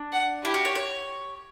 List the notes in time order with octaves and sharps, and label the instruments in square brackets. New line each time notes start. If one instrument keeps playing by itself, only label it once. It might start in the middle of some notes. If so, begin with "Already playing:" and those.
Already playing: [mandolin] D4
[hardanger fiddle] F#5
[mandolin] E4 [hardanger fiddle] G4
[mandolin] F#4
C#5
C#5